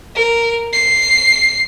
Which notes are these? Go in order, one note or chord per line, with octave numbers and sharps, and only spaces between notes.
A#4
C7